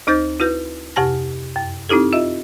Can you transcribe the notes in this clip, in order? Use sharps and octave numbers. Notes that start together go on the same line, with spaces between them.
D2 D#4 C5 G6 A6
E4 F#4 B4 G6
F2 C3 G4 G#5 A5 A#6
F#2
C4 D#4 E4 G4 A4
F4 D#5 E5